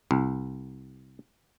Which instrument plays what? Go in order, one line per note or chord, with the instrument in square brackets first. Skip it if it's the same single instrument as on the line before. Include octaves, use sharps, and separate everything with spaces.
[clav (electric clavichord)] C2